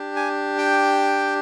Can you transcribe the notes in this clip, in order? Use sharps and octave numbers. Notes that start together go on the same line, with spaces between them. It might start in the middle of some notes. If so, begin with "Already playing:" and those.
Already playing: D4 G4
G#5
G5